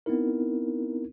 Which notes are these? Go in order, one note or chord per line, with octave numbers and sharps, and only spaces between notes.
B3 C4 D#4 E4 A#4